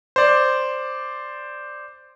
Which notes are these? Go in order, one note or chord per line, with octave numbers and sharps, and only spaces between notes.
C5 D5